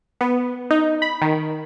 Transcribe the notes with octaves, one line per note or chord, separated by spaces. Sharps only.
B3
D#4
B5
D#3